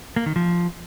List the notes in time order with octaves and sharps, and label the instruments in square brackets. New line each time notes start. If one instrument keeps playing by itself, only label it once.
[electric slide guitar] A#3
D#3
F3